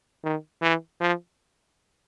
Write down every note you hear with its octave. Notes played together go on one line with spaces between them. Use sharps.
D#3
E3
F3